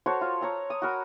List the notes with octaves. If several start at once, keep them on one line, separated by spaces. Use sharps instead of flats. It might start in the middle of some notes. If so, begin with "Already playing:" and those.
F#4 A4 C5 C#5
F4
C#5 A#5 E6
D#6
F#4 A#4 B5